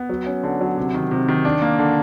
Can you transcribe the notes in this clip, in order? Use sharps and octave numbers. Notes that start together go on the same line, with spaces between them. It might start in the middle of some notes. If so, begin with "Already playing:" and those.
Already playing: B3
F#3
C#4
D3
F#3
C3
D#3
C3
D#3
D4
A#3
D3